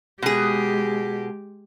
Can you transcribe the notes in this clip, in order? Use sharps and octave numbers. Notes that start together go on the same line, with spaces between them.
B2 G#3 G4 G#4